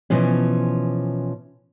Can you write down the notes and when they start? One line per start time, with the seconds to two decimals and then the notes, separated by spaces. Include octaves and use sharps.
0.10 B2 E3 F3 C#4